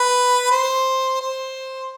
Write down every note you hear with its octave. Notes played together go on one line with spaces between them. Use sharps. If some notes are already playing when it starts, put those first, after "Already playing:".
Already playing: B4
C5
C5